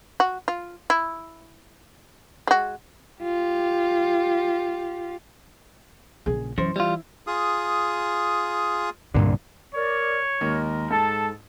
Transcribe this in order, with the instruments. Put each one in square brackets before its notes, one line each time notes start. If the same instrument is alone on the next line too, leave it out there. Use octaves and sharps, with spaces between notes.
[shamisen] F#4
F4
E4
G#3 F#4
[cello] F4 G4
[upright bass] A#1 C#3 [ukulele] G#4
[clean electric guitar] F#2 [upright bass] E3 [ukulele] C5
[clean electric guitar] G3 F4 [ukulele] E4
[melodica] F4 G#4 D#6
[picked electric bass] C2 A#2 D3 [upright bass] G2
[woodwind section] A#4 D5 [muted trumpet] C#5
[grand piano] D#2 [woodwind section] G#3 A#4
[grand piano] G#2 [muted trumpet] A4 [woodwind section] A5